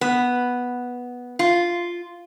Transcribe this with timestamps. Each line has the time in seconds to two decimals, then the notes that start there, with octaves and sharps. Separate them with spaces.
0.01 B3
1.39 F4